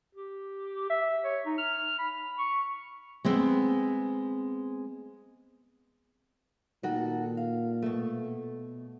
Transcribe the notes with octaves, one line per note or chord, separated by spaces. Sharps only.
G4
E5
C#5
D#4
F6
B5
C#6
G#3 B3 C4
A#2 D#3 F#4 A4
F5
B2 A3